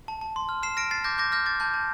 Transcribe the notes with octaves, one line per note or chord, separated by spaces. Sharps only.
A5
A5
C6
F6
F6 C7 E7
F6 A#6 D7
A5 A6 C7
D6 G6 A#6
D6 G6 A#6
F6 G6 A#6
D6 A6
A5 G6
A5